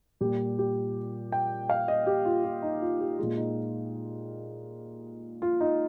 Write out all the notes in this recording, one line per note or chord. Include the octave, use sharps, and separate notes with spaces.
A#2 G3 G4
G4
G5
F5
D#5
G4
F4
F4
D#4
F4
G4
A#2 G#3 F4
D#4
F4
D#4